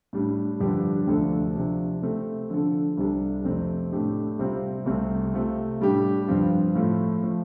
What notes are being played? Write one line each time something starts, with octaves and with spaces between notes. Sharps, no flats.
A2 G3 D4
G2 D3 F3 D4 G4
D2 C3 F3 D4 A4
C3 F3 D4
C3 A3 C4 A4
D3 F3 D4 A4
C2 C3 G3 D4 A4
F2 C3 A3 C4
A2 A3 D4 G4
C3 G3 C4 F4
C2 C3 A3 C4
C3 A3 F4
A2 G3 D4 G4
G2 F3 C4 F4
A2 F3 A3 F4
F3 A3